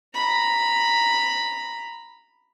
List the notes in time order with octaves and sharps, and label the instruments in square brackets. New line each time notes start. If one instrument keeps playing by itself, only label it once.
[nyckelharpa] A#5 B5